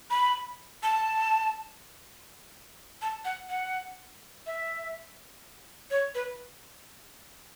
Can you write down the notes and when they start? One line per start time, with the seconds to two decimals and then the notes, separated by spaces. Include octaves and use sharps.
0.10 B5
0.83 A5
3.02 A5
3.25 F#5
3.49 F#5
4.46 E5
5.91 C#5
6.15 B4